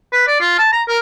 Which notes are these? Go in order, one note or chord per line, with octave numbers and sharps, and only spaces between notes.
B4
D5
F4
A5
A#5
A#4